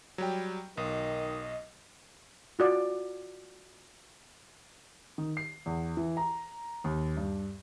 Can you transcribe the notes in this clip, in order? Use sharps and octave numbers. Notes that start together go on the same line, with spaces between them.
F#3 G3 G5
B1 D#3 D#5
F4 F#4 D5
D#3
C7
E2
E3
A#5
D#2
G2